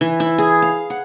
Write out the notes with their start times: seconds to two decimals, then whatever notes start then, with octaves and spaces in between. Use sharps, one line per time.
0.01 E3
0.20 E4
0.38 G#4
0.62 F5
0.90 F#5